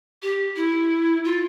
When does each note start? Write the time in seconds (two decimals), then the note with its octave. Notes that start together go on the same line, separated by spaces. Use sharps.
0.22 G4
0.56 E4
1.24 F4